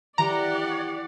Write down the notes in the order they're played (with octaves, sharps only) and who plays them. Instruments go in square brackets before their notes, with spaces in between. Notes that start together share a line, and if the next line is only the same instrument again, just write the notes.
[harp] E3 [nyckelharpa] G4 [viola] D5 F#5 [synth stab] A#5